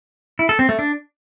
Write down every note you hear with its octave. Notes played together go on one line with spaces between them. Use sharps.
E4
A4
C4
A3
D4